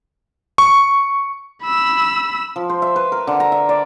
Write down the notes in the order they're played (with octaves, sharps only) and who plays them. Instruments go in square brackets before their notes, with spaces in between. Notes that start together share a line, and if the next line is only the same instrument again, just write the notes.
[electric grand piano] C#6
[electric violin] B5 E6
[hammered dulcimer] F3
C5
E5
B4
A#4
D3
A#5
E5
D5